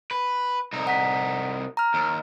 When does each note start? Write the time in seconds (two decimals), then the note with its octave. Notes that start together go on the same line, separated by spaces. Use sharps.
0.11 B4
0.73 C2 D#4
0.87 F#5 B6
1.77 A#5 F6
1.94 D#2